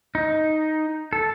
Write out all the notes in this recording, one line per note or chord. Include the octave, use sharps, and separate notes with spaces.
D#4
A4